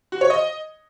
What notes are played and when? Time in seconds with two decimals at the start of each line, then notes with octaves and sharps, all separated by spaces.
0.12 F#4
0.21 C#5
0.30 D#5